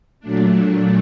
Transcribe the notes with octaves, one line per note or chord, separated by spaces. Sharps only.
A#2 F#3 A3 D4